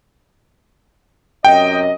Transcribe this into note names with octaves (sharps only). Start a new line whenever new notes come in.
F#2 C3 D#5 G5